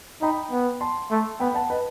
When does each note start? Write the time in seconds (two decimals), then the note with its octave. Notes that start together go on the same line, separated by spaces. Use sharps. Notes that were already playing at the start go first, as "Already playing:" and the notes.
0.21 D#4 G5 B5
0.51 B3
0.81 A5 C6
1.11 A3
1.40 B3 G5 B5
1.54 F#5 A5
1.70 B4 D#5